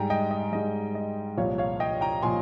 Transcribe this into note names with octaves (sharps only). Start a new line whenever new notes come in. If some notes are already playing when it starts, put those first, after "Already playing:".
Already playing: G#2 G3 G5 G#5 A#5
D#5 G5
D#5
G#2 G3 D#5
D#5
C2 A#2 F3 C#5 F5
C#5 F5
D#5 G5
G5 A#5
A#2 F3 G#5 C6